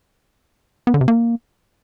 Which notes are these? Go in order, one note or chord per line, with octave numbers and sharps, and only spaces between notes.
B3
D3
C3
A#3